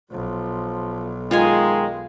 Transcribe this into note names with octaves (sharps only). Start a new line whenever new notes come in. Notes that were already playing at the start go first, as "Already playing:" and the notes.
B1 F3
D#3 G#3 F4 F5 G#5